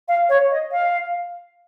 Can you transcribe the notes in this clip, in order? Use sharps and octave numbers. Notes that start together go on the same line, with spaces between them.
F5
C#5
D#5
F5